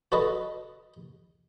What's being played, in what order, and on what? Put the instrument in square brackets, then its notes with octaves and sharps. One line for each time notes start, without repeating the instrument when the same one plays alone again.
[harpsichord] F#4 A4 B4 D#5